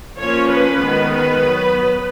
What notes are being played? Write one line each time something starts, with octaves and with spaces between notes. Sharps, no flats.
F3 A#3 C#4 C#5
B4
D#3 G#3 B3
B4
F#3 B3